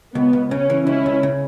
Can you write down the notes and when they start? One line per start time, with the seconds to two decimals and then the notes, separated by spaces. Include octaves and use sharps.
0.15 C#2 B3
0.33 C#2
0.51 C#3 C#4
0.70 E3
0.87 C#2 C#4 E4
1.06 C#2
1.23 C#3